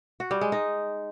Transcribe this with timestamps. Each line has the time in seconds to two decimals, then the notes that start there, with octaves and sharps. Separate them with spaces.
0.20 F#4
0.31 G3
0.41 G#3
0.52 D#4